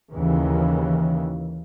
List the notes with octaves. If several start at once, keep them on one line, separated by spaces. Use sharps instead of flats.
D#2 C#3 E3